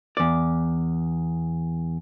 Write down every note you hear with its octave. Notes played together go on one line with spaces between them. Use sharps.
E2 D5